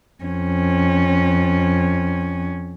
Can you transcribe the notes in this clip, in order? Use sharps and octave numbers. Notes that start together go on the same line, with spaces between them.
F2 C#4